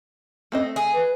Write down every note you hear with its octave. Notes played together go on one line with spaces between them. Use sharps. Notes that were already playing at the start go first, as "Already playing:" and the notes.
A3 C4 D#5
G#4
B4